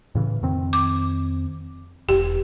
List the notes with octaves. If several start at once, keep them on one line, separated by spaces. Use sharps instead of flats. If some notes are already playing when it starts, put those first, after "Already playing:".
A2 C#3 E3
F2 D#3 C4
D6
E1 E2 G4